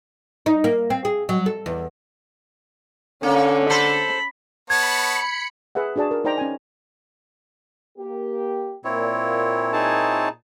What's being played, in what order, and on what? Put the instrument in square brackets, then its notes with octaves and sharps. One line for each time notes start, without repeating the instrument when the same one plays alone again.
[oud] D#4
A#3
C4
G#4
F#3
A4
E2
[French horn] D3 [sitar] A#3 [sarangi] C#4
[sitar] A4 C5 [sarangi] B5
[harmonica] B3 C#5 A5 [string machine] B5 C#7 [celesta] G#6
[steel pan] G#4 B4 E5 F#5
D4 F#4 G#4 D5 A5
A#4
D#4 C5 D5 G5 A#5
C#4 G#5
[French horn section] A#3 G4
[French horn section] A#2 [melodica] C4 E4 C#5
[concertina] D#4 G#4 A5